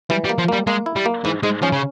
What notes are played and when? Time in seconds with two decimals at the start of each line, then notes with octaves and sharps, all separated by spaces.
0.10 E3 G3
0.24 G3
0.29 A#3
0.38 F3
0.48 G3 A#3
0.67 G#3 A#3
0.86 E4
0.96 G3
1.06 A#3
1.25 G#2 E3
1.43 G#2 G#3
1.62 F3 C#4
1.73 C#3